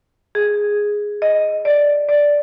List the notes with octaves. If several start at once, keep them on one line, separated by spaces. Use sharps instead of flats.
G#4
D#5
D5
D5